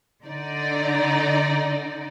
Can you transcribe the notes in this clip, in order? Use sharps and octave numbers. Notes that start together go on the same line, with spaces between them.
D3 D#4 D5